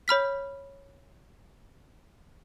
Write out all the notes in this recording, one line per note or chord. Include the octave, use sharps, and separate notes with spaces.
C#5 B5 F6 B6